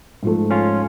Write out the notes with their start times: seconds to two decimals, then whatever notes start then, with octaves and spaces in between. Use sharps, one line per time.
0.23 G#2 F3 A3
0.50 C#4 F4